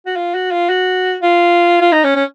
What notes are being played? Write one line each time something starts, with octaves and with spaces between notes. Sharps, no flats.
F#4
F4
F#4
F4
F#4
F4
F4
D#4
C#4
C#4